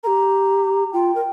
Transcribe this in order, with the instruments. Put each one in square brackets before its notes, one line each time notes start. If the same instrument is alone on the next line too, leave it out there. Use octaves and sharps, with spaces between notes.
[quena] G4 A#4 [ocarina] A#5
[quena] F4 [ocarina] G5
[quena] A#4